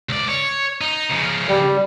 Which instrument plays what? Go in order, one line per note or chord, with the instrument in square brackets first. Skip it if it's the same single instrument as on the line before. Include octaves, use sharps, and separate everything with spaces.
[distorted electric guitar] C#2 D5
C#5
D#4
C#3 F3
[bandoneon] G3